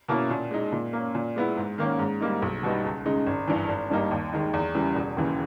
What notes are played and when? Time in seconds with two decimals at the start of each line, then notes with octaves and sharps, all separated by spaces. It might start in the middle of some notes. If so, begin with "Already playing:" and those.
0.08 B2 A#3 C#4 E4
0.30 A#2
0.51 G#3 D#4
0.72 A#2
0.93 A#3 C#4
1.15 A#2
1.36 G#3 B3 E4
1.57 G#2
1.78 D#3 A#3 C#4
1.99 G#2
2.21 G3 A#3 D#4
2.42 B1
2.63 B2 G3 B3 D#4
2.84 C#2
3.06 C#3 G#3 D#4
3.27 G#1
3.47 G2 E3
3.69 G#1
3.90 G2 G3 A#3 D#4
4.11 D#2
4.33 D#3 G#3 D#4
4.53 E2
4.75 C#3 E3 G3
4.96 E1
5.17 D#2 C#3 E3